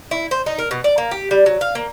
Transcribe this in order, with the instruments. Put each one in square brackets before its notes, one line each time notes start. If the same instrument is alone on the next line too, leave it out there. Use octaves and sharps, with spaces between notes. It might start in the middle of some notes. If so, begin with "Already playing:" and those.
[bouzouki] E4
C5
D#4
A#4
B2
D5
A#3
G4
G3
F#3
F5
A#3